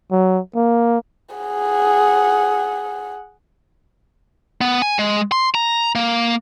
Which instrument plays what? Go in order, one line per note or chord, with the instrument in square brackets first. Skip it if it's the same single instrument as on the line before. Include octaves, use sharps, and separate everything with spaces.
[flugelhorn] F#3
A#3
[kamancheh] G#4 F#5
[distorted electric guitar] B3
G#5
G#3
C6
A#5
A#3